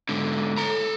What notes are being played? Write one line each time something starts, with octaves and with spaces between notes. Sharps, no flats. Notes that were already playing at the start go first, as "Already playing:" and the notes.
G#2 D3
A4 A#5